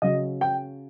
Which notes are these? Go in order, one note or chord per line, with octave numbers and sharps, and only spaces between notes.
C#3 F#3 D#5
G5